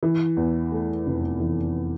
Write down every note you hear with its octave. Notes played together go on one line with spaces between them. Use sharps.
E3
E2
A3
F1
E3